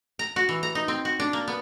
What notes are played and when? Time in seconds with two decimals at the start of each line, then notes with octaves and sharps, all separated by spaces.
0.19 A#5
0.36 F#4
0.49 E3
0.63 A#5
0.75 D#4
0.88 C4
1.05 F#4
1.20 D4
1.33 A#3
1.48 B3